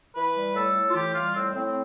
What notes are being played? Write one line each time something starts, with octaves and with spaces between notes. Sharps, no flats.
E3 B4
G3
A2 A4
A2
F4
E3 G4
G3 F4
A2 C4
A2 C4